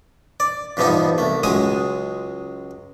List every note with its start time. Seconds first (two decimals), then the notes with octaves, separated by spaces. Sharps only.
0.40 D5
0.77 E2 G2 F3 G3 B3 D#4
1.18 C2 A3
1.43 C#2 F#3 G#3 G#5 D#6